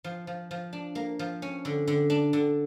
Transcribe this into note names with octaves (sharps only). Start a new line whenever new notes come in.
F3
F3
F3
D4
A#3
F3
C#4
D3
D3
D4
D3